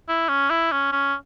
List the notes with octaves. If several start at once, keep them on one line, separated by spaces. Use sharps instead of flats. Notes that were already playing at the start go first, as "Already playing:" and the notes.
E4
C#4
E4
C#4
C#4